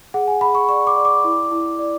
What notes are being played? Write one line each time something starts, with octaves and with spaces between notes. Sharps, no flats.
G#4 F#5
G#5
G#4 B5
C#6
D5 C#6
D6
D5
D6
E4
E4
D5